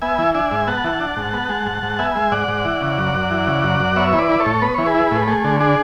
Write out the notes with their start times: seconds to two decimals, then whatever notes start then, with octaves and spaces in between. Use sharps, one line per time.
0.02 B3 E5 G#5
0.18 E3
0.34 D4 E5 G#5
0.51 G#2
0.67 B3 F#5 A5
0.84 E3
1.00 D4
1.17 G#2
1.33 B3
1.49 G#3
1.66 G#2
1.83 G#2
1.99 B3 E5 G#5
2.15 G#3
2.32 G#2 D5 F#5
2.48 G#2
2.65 E3
2.81 C#3
2.98 F#2
3.14 F#2
3.30 E3
3.47 C#3
3.64 F#2
3.80 F#2
3.96 B3 C#5 E5
4.13 E3
4.18 B4 D5
4.29 E4 B4
4.40 A4 C#5
4.46 A2
4.62 B3 B4
4.74 E3 C#5
4.86 G#4 B4
4.94 E4
5.11 A2
5.27 A3 G#4
5.44 D3
5.60 D4 G#4